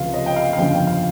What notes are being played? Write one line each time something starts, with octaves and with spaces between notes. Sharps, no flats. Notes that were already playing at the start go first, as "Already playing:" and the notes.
Already playing: C#2 C3 F3 F5
D#5
G5
F5
F5
G1 F2 C#3 G5
G5
F5